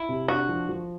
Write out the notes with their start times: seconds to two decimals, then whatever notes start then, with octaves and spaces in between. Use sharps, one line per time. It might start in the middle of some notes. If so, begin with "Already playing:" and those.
Already playing: E4
0.09 C3
0.28 D4 F#4
0.49 F3
0.69 F3